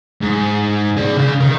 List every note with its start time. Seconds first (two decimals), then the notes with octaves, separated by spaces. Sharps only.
0.21 G#2
0.97 G#4 D5
1.17 C#3 F5
1.41 D#4 A#4